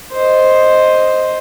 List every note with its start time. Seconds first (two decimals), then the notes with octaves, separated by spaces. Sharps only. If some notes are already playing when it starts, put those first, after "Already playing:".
0.13 C5 D#5